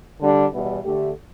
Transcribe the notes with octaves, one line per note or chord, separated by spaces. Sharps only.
D3 G3 D4
E2 B2 G3 B3 E4
D3 A3 G4